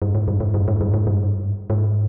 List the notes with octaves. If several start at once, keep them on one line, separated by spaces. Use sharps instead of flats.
G2
G#2
G2
G#2
G2
G#2
G2
G#2
G2
G#2